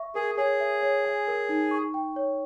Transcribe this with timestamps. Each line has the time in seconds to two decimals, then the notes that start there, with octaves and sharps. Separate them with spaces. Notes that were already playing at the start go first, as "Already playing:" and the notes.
Already playing: E5 C#6
0.15 G#4 A#4
0.37 G#4 C#5
0.60 E5
0.83 C#5
1.05 G#5
1.28 A#4
1.49 D#4
1.71 C#6
1.94 G5
2.16 C#5